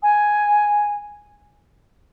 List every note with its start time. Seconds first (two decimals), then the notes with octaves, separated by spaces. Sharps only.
0.03 G#5